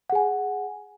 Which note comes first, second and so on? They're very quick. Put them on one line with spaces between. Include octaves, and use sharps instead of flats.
F#5 G#4 G#5